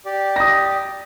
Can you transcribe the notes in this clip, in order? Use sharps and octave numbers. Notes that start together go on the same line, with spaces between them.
G4 D5
D#6 A#6